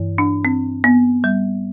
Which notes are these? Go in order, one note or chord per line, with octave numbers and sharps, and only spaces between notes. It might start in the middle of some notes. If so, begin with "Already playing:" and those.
Already playing: G2 E3
D4
C4
B3
G3